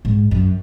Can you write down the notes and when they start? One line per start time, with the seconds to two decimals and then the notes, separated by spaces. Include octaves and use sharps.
0.05 G#2
0.31 F#2